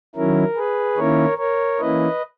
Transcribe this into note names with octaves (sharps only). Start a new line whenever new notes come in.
D#3 F#3 C#4 E4 A#4
G#4 B4
D#3 A#3 C#4 E4 A#4 C#5
A#4 C#5
E3 A#3 C#4 E4 B4 D#5